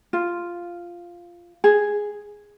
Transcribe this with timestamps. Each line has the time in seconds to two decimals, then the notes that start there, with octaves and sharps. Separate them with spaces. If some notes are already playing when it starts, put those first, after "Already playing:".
0.13 F4
1.64 G#4